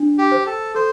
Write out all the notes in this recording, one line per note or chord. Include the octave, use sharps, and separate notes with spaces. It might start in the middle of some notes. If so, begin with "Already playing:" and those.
Already playing: D4
G4
C5
A4
A4 C5